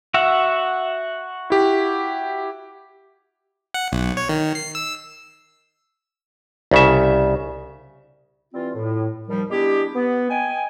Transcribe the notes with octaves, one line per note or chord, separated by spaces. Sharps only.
F#4 E5 F#5
E4 G4
F#5
B1
C#5
D#3
C7
E6
C2 C#3 E5
E3 G3 C4 F4
A2
D#2 F3 G3
G3 G#3 B3 D4 E4 G4
B3
D#5 G5 G#5